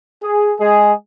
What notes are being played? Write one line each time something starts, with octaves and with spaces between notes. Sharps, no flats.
G#4
G#3 G#4